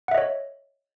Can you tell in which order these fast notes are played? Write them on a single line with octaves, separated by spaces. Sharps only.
F#5 E5 D#5 C#5